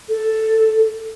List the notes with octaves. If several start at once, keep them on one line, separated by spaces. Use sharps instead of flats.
A4